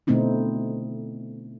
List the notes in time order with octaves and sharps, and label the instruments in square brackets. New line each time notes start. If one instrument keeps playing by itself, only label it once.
[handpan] B2 D3 A3 C4 D#4 E4